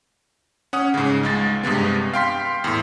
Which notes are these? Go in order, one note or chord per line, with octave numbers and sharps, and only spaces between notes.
C#4 F#5 D#6
G#2 C#3
C#2 G#3 A6
G2 C3 G#3 B3
F5 G5 C6 B6
E2 A2